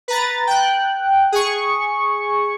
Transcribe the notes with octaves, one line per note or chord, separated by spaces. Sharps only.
B4 A#5 A6
G5 F#6
G#4 C#6